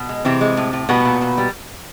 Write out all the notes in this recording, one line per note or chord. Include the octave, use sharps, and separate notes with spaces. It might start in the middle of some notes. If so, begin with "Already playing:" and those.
Already playing: B2
G#3
C3 E3 C4
G#3
A2
A2
B2 G3 B3
A#2
A#2
G3